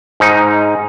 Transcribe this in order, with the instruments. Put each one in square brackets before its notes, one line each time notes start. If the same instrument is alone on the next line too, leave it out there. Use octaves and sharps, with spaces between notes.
[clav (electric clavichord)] G#2 D#4